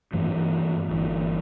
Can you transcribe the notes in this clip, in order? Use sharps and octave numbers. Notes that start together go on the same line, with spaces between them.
G2 E3 A3
G1 G2 E3